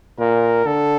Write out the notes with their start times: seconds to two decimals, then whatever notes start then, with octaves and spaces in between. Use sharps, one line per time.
0.19 A#2 A#4
0.66 D3 A4